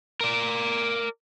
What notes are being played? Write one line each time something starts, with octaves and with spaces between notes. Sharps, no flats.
A#4 D5